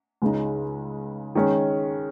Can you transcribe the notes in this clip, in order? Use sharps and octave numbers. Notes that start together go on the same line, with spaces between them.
C#2 C#3 G#3 D#4
D#3 G#3 C#4